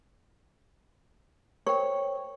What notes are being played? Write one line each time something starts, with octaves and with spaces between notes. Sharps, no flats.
A#4 C5 C#5 G5